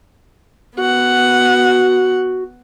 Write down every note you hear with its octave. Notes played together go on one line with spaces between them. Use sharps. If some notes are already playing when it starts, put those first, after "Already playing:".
B3 F#4 F#5